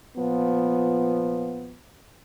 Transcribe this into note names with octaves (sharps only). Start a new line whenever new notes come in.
A#2 F3 B3